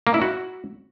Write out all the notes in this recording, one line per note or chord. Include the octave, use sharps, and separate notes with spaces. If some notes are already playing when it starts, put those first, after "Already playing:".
A#3
E4
F#4